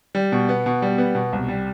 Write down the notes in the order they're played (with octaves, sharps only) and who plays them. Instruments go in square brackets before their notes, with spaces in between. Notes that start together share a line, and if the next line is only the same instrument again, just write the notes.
[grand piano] G3
B2
B3
B2
G3
B3
B2
C2
G3